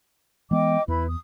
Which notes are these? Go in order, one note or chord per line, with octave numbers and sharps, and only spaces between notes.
E3 G#3 B3 D#5 G5 D6
E2 E4 B4 B5
D#6